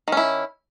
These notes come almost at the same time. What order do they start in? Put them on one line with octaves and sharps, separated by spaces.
D#3 C#4 E4